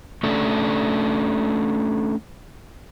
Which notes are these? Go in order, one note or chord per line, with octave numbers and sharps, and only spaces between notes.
A3 C#4 D4 A4